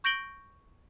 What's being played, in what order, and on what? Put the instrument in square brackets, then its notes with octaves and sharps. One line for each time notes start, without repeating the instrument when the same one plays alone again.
[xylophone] C#6 G6 A#6 D7 F#7 G7